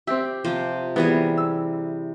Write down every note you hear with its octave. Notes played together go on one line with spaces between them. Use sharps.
C4 G4 E5
C3 F3 C5
E3 G3 B3 G#4
E6